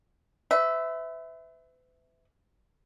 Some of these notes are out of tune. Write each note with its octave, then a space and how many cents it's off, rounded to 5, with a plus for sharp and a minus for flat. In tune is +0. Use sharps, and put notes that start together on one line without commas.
B4 +40 E5 -10